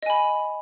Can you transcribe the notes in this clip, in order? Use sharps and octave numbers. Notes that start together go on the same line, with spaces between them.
D#5 G#5 B5